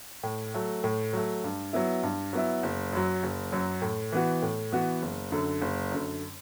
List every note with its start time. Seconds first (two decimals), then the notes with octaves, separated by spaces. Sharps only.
0.23 A2
0.54 F#3 A3
0.84 A2
1.13 F#3 A3
1.44 G2
1.73 F#3 B3 E4
2.03 G2
2.33 F#3 B3 E4
2.63 F#1
2.93 F#2 F#3
3.23 F#1
3.52 F#2 F#3
3.82 A2
4.12 E3 B3 F#4
4.42 A2
4.72 E3 B3 F#4
5.02 F#1
5.32 F#2 D3
5.61 F#1
5.92 F#2 D3